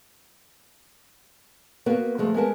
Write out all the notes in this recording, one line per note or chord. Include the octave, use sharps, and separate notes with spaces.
A#3 B3 F#4 A#4
F3 G#3 A3
G#3 B3 A#4 A5